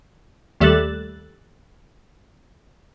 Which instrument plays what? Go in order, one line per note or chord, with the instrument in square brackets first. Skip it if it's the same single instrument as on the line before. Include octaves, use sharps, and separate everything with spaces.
[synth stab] D#2 G3 A3 E6 F#6 A6